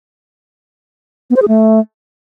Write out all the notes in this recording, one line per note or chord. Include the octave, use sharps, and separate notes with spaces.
B3
C5
G#4
A3